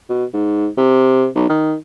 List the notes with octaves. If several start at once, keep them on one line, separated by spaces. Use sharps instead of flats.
B2
G#2
C3
B1
D#3